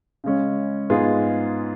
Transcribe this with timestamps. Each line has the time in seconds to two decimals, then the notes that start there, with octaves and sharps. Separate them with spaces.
0.24 C#3 G#3 C#4
0.90 G#2 G#3 B3 F4 G#4